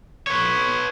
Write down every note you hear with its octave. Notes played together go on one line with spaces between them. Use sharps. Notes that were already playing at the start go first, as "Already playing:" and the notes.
B4 C#5